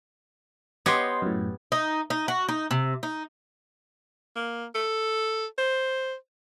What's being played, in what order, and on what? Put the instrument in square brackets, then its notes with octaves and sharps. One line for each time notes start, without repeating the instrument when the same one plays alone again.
[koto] B3 G4 C#5 [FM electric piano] D#5 C6
[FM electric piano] F#2 A2
[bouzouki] D#4
D#4
F#4
D#4
C3
D#4
[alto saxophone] A#3
A4
C5